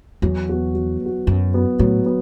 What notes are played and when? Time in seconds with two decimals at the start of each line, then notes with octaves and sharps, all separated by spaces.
0.22 E2 F#3
0.49 B3 F#4
0.75 F#3
1.01 B3 F#4
1.27 F#2 F#3
1.54 B3 F#4
1.79 A2 F#3
2.06 B3